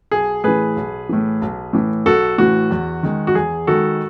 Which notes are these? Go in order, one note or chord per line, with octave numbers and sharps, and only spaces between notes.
B1 G#4
A2 E3 G#4 B4
B1
A2 E3
B1
A2 E3
B1 F#4 A4
A2 E3 F#4
E2
D#3 G#3
F#4
E2 G#4
D#3 G#3 F#4 A4